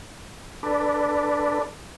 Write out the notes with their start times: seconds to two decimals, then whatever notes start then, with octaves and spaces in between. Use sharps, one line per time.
0.63 D4 A4 B4 D5